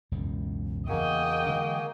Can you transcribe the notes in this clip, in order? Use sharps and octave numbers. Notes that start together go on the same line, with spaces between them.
E1 C#2 F#2
E2 C#3 A#3 F#4 G#4 A#4 D#5 G5
D3 E3 G#3